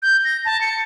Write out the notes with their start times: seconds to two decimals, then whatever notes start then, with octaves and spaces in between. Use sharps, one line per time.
0.02 G6
0.24 A#6
0.45 A5
0.61 C#7